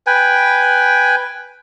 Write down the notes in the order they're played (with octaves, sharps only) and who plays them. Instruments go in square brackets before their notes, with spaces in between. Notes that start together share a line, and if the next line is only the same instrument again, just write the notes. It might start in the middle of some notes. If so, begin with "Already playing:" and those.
[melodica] B4 G5 G#5